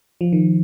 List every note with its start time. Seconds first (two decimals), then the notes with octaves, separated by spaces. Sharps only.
0.21 F3
0.32 D#3